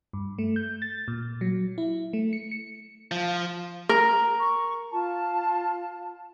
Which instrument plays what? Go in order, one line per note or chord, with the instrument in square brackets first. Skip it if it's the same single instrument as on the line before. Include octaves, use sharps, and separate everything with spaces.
[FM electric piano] G2
A3
G6
A6
A#2
F#3
E4
A3
C#7
C#7
[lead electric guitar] F3
[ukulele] A#4
[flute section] C#6
F4 A5